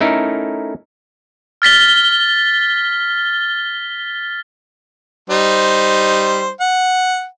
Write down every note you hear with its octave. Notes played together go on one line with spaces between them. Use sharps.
A3 C#4 D#4 E4 A4 A#4
F6 A6 B6 G7
G3 D#4 C5
F#5